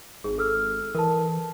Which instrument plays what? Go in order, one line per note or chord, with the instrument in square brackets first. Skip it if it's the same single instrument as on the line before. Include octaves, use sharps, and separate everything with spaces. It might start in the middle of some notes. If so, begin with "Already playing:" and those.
[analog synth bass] G#1 [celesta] G#4
[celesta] A4 E6 F6
[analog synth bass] E3 [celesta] A#4 A5